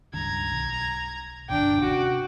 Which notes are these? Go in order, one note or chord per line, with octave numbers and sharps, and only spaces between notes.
C#2 G2 D#3 A#5 G#6
B1
G1 D#2 C3 D4 G5 D6
C3 C4 C#4 F#4